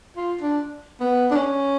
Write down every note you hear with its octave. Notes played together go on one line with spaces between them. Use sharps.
F4
D4
B3
D4
C#4